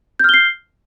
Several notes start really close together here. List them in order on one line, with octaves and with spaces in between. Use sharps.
G6 F6 G7 C7